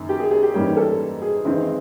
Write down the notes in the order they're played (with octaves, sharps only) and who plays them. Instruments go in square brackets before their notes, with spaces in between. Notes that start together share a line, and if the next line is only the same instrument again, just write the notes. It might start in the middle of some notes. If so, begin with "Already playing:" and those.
Already playing: [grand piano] F#1 F#2 D#3
[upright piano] G4
G#4
G#4
G4
[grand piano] G#2 E3 G3 A#3 C#4 [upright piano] G4
[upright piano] A4
G#4
[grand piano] G#1 G#2 E3 G#3 C4 [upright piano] E4